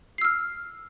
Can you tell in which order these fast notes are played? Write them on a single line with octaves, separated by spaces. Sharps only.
C7 E6 F6